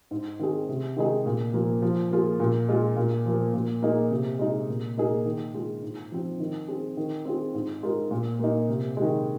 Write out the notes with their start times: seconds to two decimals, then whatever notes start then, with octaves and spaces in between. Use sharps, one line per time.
0.11 G#2
0.39 D#3 C4 G#4
0.68 C3
0.96 D#3 G#3 D#4 G#4
1.26 A#2
1.53 F3 A#3
1.82 F3
2.11 A#3 F4 G#4
2.40 A#2
2.69 G#3 F4
2.96 A#2
3.25 F3 A#3
3.53 A#2
3.82 A#3 D#4 G#4
4.11 C3
4.39 G#3 D#4
4.69 A#2
4.97 A#3 D#4 G#4
5.25 D#3
5.54 G#3 F4 G#4
5.83 G#2
6.12 F3 C4
6.40 D#3
6.68 C4 G#4
6.97 D#3
7.25 C4 F4 G#4
7.54 G#2
7.83 G#3 F4 A#4
8.11 A#2
8.39 A#3 D#4
8.69 C3
8.97 D#3 G#3